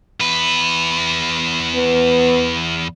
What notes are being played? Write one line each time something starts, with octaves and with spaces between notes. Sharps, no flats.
E2 B4
B3